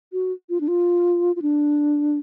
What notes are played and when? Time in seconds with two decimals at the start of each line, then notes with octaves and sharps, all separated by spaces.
0.13 F#4
0.50 F4
0.61 D4
0.68 F4
1.36 F4
1.42 D4